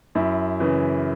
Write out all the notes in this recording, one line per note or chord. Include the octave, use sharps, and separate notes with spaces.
F#2 E4
C#3 E3